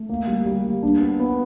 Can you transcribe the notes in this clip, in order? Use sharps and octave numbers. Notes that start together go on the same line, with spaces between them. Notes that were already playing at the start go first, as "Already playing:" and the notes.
Already playing: A3
A#3
G3
G3
A#3
D4
B3
B3